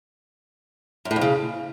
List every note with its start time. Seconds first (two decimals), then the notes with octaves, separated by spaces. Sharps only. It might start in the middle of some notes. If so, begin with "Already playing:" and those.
1.05 F#2
1.11 A2
1.16 F2
1.21 C#3